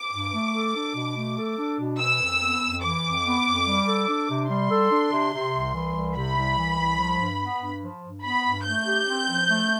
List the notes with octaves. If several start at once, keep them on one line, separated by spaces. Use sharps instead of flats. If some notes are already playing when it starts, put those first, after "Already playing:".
Already playing: D6
G2
A3
A4
D4
B2
A3
A4
D4
B2
E3 E6
F2
B3
F2
E3 D6
F2
B3
F2
G3
A4
D4
C3
G3 C6
A4
D4
C3
C3
C2
E3
C2
C3 B5
C2
E3
C2
F3
G2
B3
G2
F3
G2
B3 B5
G2
A3 G6
G4
C4
F3
A3